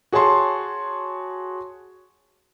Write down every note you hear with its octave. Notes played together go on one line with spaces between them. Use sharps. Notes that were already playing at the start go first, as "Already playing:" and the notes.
F#4 G#4 C#5 A5 C6